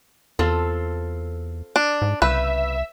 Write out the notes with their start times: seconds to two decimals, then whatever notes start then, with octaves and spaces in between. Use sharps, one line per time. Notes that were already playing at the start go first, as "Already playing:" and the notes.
0.39 E2 C4 F4 A4
1.76 D4
2.02 G#2
2.22 C2 C#3 B4 E5